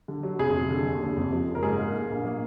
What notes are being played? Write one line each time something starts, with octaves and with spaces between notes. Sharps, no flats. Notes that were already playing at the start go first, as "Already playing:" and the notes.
D3
F#3
F1 G#4
F1
D3
D#2
F#1
F2
F3
F#1
A#4
G#2 G#4
A#3
A#3
A#1
A#3